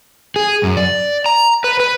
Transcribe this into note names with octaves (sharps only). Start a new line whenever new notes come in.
G#4
F#2
D5
A#5
B4
B4